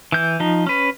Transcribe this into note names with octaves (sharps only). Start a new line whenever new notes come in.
E3 G6
F3 D#4
C#4 B4